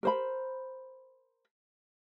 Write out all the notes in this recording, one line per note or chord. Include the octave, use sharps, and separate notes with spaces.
A#4 C5 B5